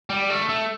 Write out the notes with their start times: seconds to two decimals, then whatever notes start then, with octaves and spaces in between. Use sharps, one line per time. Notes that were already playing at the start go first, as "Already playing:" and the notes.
0.10 G3
0.30 A3
0.49 A3